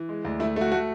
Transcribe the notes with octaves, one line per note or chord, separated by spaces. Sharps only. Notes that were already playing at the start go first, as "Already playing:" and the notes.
Already playing: E3
G#3
D2
A3 E4
A3 F#4
A3 F#4